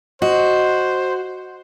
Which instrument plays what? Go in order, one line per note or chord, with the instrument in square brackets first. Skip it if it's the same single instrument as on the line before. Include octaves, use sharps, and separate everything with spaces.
[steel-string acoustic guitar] F#4 [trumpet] C5 [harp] D#5